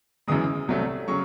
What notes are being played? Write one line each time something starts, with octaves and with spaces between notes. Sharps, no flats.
F#2 C#3 E3 G#3 D#6
C2 C3 F#3 A3
C#3 F#3 C#6